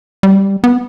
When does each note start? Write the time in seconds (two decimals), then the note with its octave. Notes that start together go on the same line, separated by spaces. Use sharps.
0.23 G3
0.64 B3